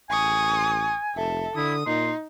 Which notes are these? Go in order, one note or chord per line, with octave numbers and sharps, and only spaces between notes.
A1 G#5 C#6 D#6
F1 A4 E5
D3 E4 D#6
A#2 D#4 C6